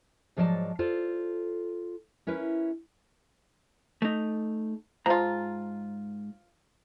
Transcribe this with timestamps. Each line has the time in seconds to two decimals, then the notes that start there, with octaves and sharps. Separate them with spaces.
0.37 G#2 F3 F#3 D5 D#5 A5
0.79 F4 A4 C5 D5
2.27 C#4 E4 A#4 B4
4.02 A3 D#4
5.06 G#2 F3 F4 A#5